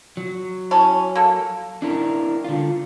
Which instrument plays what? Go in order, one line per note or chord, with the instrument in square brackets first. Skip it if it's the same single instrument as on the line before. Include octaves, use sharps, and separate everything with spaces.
[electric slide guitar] F#3
[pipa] E3 C#4 A5
A#3 A4
[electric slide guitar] D4 E4 A#4
D3 F4